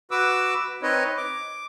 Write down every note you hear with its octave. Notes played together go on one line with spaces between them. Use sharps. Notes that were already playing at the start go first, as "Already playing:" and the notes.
F#4 B4 D6 E6
C4 D#4 B4 C#5 D#5
D6